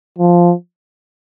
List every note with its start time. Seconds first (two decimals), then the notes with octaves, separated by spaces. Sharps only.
0.18 F3